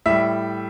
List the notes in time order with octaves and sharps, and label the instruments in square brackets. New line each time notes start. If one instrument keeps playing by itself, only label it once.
[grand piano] A2 G3 E5